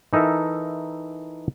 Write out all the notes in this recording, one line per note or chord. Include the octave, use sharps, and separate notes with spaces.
E3 D#4 A4 A#4 E5